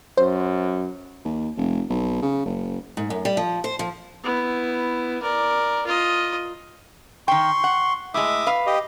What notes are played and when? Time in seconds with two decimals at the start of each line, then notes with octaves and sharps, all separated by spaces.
0.18 F#2 C5
1.25 D#2
1.57 F1
1.90 B1
2.22 C#3
2.45 F#1
2.97 G#2
3.10 F#2
3.25 G3
3.37 F3
3.64 C5
3.79 F3
4.23 B3 E4
5.22 A#4 D5
5.86 F4 D#5
7.28 D#3 G5 C6 C#6
7.64 F#5
8.14 A2 G#3 E5 D6 D#6
8.46 B4 F5
8.67 G4 D#5